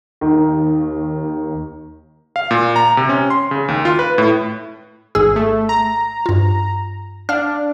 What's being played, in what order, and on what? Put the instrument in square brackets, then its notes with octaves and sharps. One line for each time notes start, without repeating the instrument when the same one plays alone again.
[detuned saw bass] D#2 [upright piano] D#3
[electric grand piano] F5
A#2
A#5
C3
C#4
C6
C#3
D#2
F4
B4
A2
[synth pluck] G#1 G#2 E6 [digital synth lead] G#4
[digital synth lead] A3
A#5
[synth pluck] G2 F4
[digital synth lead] D4 [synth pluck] F5 F6